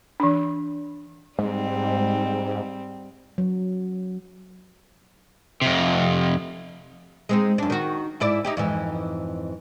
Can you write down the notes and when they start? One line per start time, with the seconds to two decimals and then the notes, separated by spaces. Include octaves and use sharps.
0.20 E3 D4
1.39 G#2 G3 C4
3.38 F#3
5.61 F2 C3
7.29 G#3 C4 D#4
7.58 F#2 D4
7.70 D#3 F#4
8.20 G#2 E4 D5
8.45 D#4 E4 G4
8.57 F2 G#2 E3